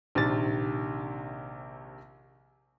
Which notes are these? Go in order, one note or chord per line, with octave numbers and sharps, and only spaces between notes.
A#1 C3 D#3 A6